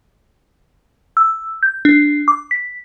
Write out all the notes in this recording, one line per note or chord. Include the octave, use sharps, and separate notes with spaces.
E6
G6
D4
D6
B6